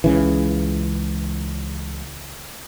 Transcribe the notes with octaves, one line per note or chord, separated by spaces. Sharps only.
C#2 C#3 E3